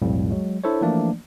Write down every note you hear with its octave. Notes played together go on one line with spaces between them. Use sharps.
B1 F2 A2 G3
F#3 G#3
D4 E4 A4 C5 C#5
E3 F3 A3 A#3 D4 D5